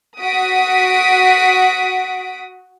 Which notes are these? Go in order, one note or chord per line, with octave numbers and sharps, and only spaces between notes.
F#4 F#5 D#6 B6 D7